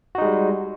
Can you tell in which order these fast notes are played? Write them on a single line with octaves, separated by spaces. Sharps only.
F#4 D#4 G#3 G3